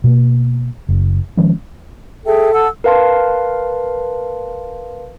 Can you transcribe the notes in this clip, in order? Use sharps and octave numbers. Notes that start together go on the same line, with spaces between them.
B2 A#3
F#1
D#3 F3 G#3 C#4
G#4 A4 E5 G5
F#5 A5 E6
A#4 B4 F5 A5 C6